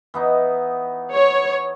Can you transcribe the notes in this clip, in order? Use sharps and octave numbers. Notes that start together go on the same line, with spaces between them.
E3 B3 D#4
C#5